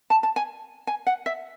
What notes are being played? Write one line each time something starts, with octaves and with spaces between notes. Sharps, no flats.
A5
A5
G#5
G#5
F#5
E5